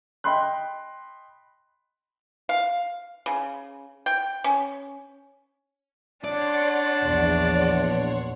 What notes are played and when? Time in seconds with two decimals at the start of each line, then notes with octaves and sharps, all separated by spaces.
0.24 D#5 G5 B5 C6 F#6
2.49 F5
3.26 C#3
4.06 G5
4.44 C#4
6.24 D4 C#5 D5 F#5 C6
7.04 A#1 E2